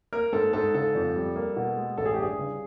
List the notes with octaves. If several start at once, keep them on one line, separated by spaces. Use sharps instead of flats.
A#3 A#4
G#2 A4
G#2 A4
C#3 A4
F2
G3
A#3
B2
G#3
A1 A4
G#4
G4
G2 G#4
C#3